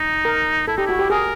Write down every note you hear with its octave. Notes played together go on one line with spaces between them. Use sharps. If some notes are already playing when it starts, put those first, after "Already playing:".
Already playing: D#4
A#4
E4 A4
D#4 G4
E4 F#4
G4
G#4 A#4